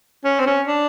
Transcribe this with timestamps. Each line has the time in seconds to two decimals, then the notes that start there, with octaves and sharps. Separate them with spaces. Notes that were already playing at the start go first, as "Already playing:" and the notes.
0.25 C#4
0.40 C4
0.47 C#4
0.67 D4